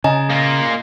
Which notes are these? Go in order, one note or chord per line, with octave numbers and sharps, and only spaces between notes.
C#3 D#5 G#5 A#5
A#3 F4